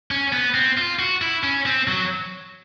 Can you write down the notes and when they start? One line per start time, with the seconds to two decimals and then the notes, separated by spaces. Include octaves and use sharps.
0.11 C#4
0.32 B3
0.54 C4
0.77 F4
0.99 F#4
1.22 E4
1.44 C#4
1.66 C4
1.88 F#3